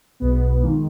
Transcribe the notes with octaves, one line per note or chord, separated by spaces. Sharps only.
B1 B2 G#3 B3
F2 D#3 G#3 A#3